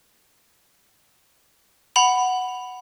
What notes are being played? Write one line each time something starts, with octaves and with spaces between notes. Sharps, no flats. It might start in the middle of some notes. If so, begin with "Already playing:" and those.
F#5 B5 F7